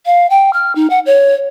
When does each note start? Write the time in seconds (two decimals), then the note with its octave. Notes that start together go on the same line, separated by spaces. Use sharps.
0.06 F5
0.30 G5
0.53 F6
0.76 D#4
0.90 F#5
1.06 C#5